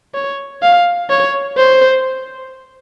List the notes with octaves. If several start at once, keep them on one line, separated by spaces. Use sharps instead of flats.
C#5
F5
C#5
C5